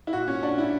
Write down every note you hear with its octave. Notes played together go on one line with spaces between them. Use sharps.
E4
A#2 F#4
C#4
D4
E4